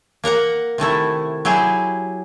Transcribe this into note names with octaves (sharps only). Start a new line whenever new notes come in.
A#3 A#4 F#5 A#5
C3 D#3 A3 E4
F#3 E4 G4 G#4